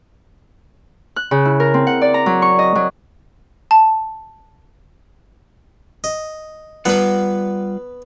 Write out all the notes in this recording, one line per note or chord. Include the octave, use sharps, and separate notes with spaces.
F#6
C#3
E4
A#4
C4
F#5
D5
A#5
F#3
C#6
D#5
F#3
A5
D#5
G3 B3 F4 B4 F#5